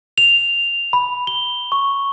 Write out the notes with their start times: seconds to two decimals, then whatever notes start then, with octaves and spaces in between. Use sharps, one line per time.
0.18 F7
0.93 B5
1.27 G7
1.72 C#6